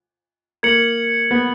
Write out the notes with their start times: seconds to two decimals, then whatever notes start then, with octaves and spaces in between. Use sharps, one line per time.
0.63 A#3 G#6 C#7 F#7
1.31 B3